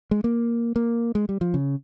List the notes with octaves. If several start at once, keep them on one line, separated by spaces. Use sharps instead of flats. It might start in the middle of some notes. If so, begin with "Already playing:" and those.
G#3
A#3
A#3
G#3
G3
F3
C#3